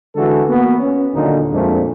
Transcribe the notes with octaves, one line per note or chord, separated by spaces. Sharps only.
D3 E3 G#3 F#4 A4
A#3 B3 F#4
C#4
D#2 A#2 D3 F#3 D#4
F2 A#2 G#3 A3 C4 D4